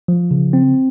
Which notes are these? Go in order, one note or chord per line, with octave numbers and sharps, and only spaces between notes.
F3
C#3
C4